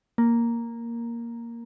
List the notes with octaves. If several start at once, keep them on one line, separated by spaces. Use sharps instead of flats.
A#3